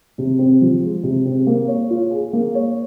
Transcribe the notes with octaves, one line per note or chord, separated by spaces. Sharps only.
C3
C4
F3
G#3
C3
C4
A#3
C#5
F4
G#4
A#3
C#5